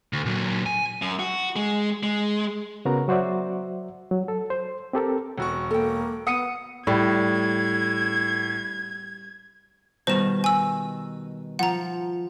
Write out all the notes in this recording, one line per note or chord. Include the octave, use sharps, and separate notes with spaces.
D2
A#2 F#3
G#5
F#2
F#4
G#3
G#3
C#3 B3 F#4 A#4 A#5
F#3 F#4 C5 D5 E5
F#3
A4
C5
C4 G4 A4 A#4
E1 F#4 C#6
A#3 A4 G5
B3 F#5 D#6 C#7 D#7
A2 G3 G#6
B2 D#3 G3 C5 E7
G#5 E6
F3 F#5 A#5